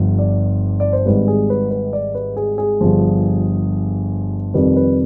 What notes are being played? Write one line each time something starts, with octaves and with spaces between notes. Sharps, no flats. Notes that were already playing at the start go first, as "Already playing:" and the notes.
Already playing: G1 G2 F3
D5
D5
C5
G#1 G#2 G3 B4
G#4
B4
B4
D5
B4
G#4
G#4
G1 G2 F3
F2 C3 D#3 G3 B4
B4